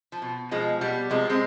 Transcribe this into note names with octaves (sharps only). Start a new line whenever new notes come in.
F3
B2
B2 F3 G#3
B2 G3 B3
C3 F3 G#3
G#3 C4